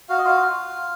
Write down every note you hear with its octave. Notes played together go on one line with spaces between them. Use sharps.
F#4 F5
D#5
F4 F5
F4